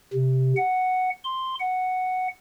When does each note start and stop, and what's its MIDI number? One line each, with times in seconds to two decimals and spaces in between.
0.13 0.53 48
0.57 1.10 78
1.24 1.55 84
1.60 2.28 78